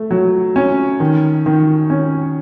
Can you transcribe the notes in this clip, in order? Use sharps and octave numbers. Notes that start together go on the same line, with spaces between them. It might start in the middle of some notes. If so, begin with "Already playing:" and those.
Already playing: A3
F#3
C#4
D#3
D#3
C#4